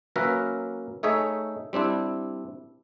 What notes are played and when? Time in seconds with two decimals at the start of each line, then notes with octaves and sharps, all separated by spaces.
0.16 F#3 A#3 C#4 A#4 B4 E5
1.03 A3 D#4 G#4 C#5 E5
1.73 G3 C4 D4 E4